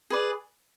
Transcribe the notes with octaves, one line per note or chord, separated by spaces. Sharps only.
G#4 B4 D5